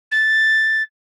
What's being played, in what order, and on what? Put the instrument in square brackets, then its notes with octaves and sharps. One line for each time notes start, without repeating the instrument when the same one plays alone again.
[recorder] A6